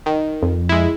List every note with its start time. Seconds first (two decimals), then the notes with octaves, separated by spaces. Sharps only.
0.06 D#3
0.43 F2
0.69 G#3 E4